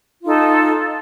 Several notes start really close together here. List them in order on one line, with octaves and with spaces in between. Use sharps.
F4 D#4 A4